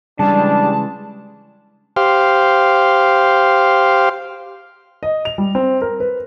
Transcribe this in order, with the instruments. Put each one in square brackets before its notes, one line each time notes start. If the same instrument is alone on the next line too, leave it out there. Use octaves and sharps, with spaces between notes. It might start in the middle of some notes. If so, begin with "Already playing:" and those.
[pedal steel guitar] C#3 E3 G#3 [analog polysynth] G3 G#4 [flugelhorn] D4 [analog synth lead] A5
[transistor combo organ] G4 C5 F5
[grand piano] D#5
F7
G3
C4
A#4
B4